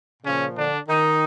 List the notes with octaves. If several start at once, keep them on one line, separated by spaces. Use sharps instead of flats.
A#2 C#3 F3 C#4
D3 D4
D#3 D#4